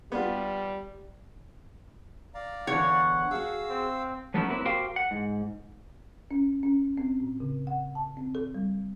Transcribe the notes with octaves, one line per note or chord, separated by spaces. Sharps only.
G3 B3 D4 F4
D5 F5 A#5
E2 D3 C#5 F#5
F#4 G#4 F5 E6
C4
F#3 A3 B3 C#4 D#4 E4
A#3 C4 E4 B4
F#4 G4 A#4 C5 F5 G5
F#5
G#2
C#4
C#4
C4
A2
C#3
F#5
A5
C4
A4
G3